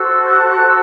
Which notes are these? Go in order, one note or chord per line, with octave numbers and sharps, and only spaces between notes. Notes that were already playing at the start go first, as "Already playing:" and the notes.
Already playing: F#4 A4 C5 E6
G6
F#6
E6